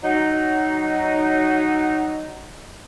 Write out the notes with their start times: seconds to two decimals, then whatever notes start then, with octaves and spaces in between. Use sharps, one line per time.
0.03 F#3 D#4